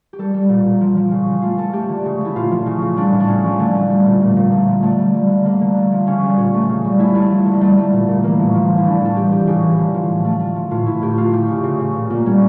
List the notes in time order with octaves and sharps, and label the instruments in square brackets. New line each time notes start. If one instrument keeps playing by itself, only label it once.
[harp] G4
G3 A4
G3
A#2
A#2
F3
F3
C#3
C#3
A3 F4
A3 A4
A3 G4
D3
C#3
A3 E4
A#2 F4
F3
C#3
C#3
G3 D4
A2
D4
C#3 C#4
F3
D3 A3
A3
G3
A#2
A#2 A#3
A#2
A3
F3
D3 A3
G3
G3
D3
D3 A#3
D3
A3
F3
C#3 C#4
G3
A#2 C#4
A3
C#3
G3
A3 E4
A3
F3
D3
A#3
G3 A3
G3
A#2
A#2
E3 A#3
A2
F3
C#3
E4
E3 D4
A2 A4
G3 G4
A#2 G4
C#3 G4
E3
D3
F3
A2
A3
A3
F3
A2 F4
A2 E4
A2 G4
A3 F4
C#3 G4
C#3
C#3
C#3
A#2
A#2 A#3
G3 C#4